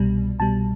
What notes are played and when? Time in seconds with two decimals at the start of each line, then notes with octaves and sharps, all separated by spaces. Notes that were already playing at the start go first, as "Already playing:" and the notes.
Already playing: C2 B2 G3
0.39 C2 B2 G3 A5